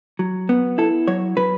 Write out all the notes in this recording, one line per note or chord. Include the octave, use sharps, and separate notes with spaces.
F#3
B3
E4 A4
F#3 C#5
F#3 B4